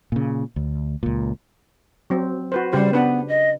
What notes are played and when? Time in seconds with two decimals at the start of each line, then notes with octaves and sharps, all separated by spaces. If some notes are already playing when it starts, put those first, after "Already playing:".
0.12 A#2 C#3
0.56 D2
1.03 C#2 A#2
2.10 F#3 C4
2.52 F#4 B4 C5
2.73 C#3 G3 G4 C5
2.93 B3 D4 B4
3.28 D#5